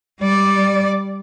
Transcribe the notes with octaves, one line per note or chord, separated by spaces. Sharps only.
G3 D5